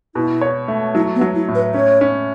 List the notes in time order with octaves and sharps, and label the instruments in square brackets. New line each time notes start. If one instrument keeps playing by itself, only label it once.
[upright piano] B2 [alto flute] E4
[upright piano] C#5
A3
[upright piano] F#3 [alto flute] E4
[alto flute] B3
[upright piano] F#3
[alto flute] E4
[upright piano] A2
[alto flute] B4
[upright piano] C#4 [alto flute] C#5
[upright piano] C#4